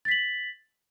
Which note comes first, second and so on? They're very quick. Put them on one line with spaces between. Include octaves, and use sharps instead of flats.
A6 B6 F#7